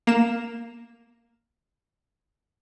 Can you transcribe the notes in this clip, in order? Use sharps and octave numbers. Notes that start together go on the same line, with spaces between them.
A#3 E7